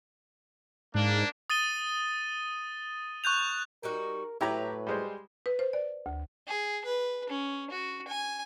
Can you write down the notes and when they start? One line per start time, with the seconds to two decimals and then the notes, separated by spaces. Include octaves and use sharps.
0.95 G#2 A#3 D4
1.50 D#6 A6 D#7 G7
3.24 C#6 F#6 G6 F7
3.83 G3 D#4 F#4 A#4
4.41 A2 F#3 E4 G4 B4 A#5
4.87 G3 G#3 C5
5.46 B4
5.59 C5
5.73 D5
6.06 D2
6.48 G#4
6.85 B4
7.30 C#4
7.70 F#4
8.08 G#5